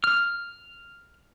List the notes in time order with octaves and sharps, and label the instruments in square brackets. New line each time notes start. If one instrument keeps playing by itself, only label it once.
[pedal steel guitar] F6